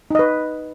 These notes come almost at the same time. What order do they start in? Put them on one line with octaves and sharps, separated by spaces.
D#4 D#5 B4